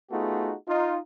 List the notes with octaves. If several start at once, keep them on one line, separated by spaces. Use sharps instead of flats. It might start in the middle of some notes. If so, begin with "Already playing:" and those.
A3 B3 D#4 F4 F#4 G#4
D#4 F4